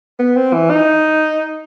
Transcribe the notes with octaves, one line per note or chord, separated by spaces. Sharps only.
B3
C4
E3
D#4